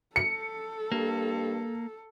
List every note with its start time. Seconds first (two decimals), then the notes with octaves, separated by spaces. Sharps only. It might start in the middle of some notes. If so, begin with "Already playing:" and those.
0.16 A4 C#7
0.92 G2 A#3